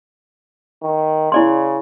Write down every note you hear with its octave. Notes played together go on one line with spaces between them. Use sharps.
D#3
C#3 E4 D5 C6